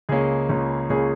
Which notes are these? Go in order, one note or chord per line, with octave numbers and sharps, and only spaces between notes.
C#2 C#3 A#3 C#4 G#4
C#2 C#3 A#3 C#4
C#2 C#3 A#3 C#4 G#4